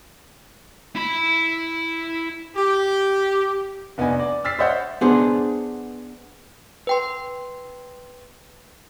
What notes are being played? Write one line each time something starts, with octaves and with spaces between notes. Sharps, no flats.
E4 B5
G4
F1 B3 D4 D#4 G#5
D5
E6 F6 A6 B6 C7
C5 C#5 D#5 E5 F#5 G6
B3 D4 G#4 C5
B4 G5 C6